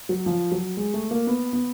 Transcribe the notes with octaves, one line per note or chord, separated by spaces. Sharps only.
F#3
F3
F#3
G#3
A3
A#3
B3
B3